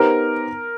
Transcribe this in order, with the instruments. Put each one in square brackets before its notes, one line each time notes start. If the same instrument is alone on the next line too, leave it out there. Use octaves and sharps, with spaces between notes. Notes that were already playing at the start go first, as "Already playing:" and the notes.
Already playing: [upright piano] B3 D#4 G4 C5 [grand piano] A#4